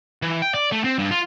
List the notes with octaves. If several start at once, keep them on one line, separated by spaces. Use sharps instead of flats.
E3
G5
D5
A3
C4
G2
F4